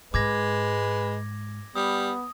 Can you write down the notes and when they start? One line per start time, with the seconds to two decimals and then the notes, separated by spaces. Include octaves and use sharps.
0.14 G#2 G#3 B4 D6 G#6 A#6
1.76 G3 B3 D#6